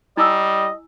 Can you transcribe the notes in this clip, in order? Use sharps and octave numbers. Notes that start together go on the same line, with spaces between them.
G3 E4 D#5 G#5 E6